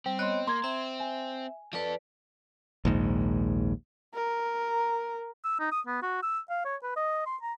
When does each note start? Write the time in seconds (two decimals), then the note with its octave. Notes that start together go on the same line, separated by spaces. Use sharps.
0.06 G3 C4 G5
0.19 B3 C#5 D#5 C6 F#6
0.47 A#3 A#5 C6 G#6
0.64 C4 E5
1.00 G#5
1.73 F3 A4 B4 D5
2.85 A#1 D#2 G#2
4.14 A#4
5.44 E6
5.59 D#4
5.72 D#6
5.87 B3
6.02 F#4
6.23 E6
6.50 F5
6.65 C#5
6.83 B4
6.96 D#5
7.26 C6
7.42 A#5